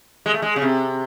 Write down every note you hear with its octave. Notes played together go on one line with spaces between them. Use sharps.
G#3
A3
G#3
C#3
C3